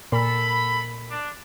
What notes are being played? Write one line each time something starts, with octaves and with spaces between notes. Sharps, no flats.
A#2 A4 B5
D4